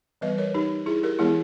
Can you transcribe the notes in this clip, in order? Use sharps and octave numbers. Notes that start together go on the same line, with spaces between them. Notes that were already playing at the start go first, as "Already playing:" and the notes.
E3 G3 B3 B4 D#5
A#4 C#5
D#4 G4
E4 G#4
G4 A#4
E3 G#3 B3 E4 G#4